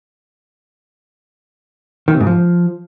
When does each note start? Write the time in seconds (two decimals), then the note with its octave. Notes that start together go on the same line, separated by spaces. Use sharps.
2.08 D#3
2.14 C3
2.20 G#2
2.27 F3